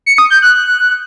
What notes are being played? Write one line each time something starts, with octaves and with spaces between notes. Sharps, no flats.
C#7
D#6
G6
F#6